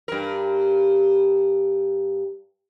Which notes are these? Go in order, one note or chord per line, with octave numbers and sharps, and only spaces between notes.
G2 A#4